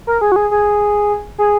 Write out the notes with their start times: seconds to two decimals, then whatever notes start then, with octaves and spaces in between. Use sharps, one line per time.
0.07 A#4
0.21 G#4
0.32 F#4
0.36 G#4
0.51 G#4
1.38 G#4